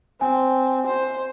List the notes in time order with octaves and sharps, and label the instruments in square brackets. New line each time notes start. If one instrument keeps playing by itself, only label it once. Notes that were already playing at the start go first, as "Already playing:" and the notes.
[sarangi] C4 [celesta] G#5
[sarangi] C5